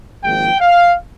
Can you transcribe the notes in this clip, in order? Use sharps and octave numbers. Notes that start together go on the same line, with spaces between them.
G#1 G#2 F3 A#3 G5
F5